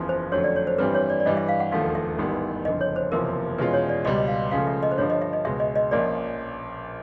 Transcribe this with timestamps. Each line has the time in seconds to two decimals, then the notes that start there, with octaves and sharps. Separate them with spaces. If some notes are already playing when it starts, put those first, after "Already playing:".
Already playing: F#1 E2 C#3 F3
0.09 C5
0.32 F2 D3 F#3 A3 C#4 C#5
0.44 D5
0.56 C#5
0.67 C5
0.78 G2 E3 G3 C4 B4
0.95 C#5
1.10 D5
1.20 D5
1.25 G2 E3 G3 D#5
1.37 E5
1.48 F5
1.60 F#5
1.71 E1 D#2 D3 F3 A3 F5
1.95 E5
2.18 A1 G#2 D#3 G3 B3
2.65 F#1 F2 D3 D#5
2.81 C#5
2.96 C5
3.11 F#1 E2 C3 F3 A#3 A#4
3.58 E2 B2 G#3 C#4 F4 B4
3.74 C#5
3.89 D5
4.05 C#2 B2 G3 D#5
4.17 D#5
4.28 F5
4.51 C#2 C#3 F3 A3 F5
4.67 E5
4.83 D#5
4.92 C5
4.97 G2 D3 F3 C#5
5.10 D#5
5.21 E5
5.33 D#5
5.45 C#2 B2 G#3 E5
5.60 D#5
5.76 D#5
5.91 A#1 A#2 F3 A#3 C#4 D5